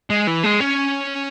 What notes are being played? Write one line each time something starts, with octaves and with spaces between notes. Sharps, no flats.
G#3
E3
G#3
C#4